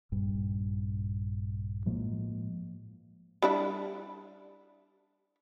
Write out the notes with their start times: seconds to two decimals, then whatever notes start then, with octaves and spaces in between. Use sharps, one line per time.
0.12 A#1 G2 G3
1.86 A2 F3 G#3 A#3
3.42 G3 D4 E4